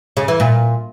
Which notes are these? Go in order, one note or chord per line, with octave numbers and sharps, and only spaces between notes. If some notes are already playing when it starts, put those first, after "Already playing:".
C#3
E3
A#2